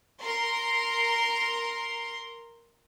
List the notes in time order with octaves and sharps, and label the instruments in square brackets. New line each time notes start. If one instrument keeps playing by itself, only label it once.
[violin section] A#4 C6